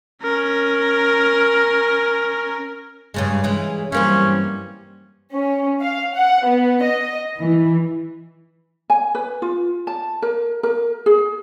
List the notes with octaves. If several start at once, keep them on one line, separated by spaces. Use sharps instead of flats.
C#4 A#4
G2 C#3 G#3
C#3 E3 G#3
G2 E3 F#3 G3 A#3 C4 C#4
C#4
F5
F#5
B3
D#5
E3
G#5
B4
F4
A5
A#4
A#4
G#4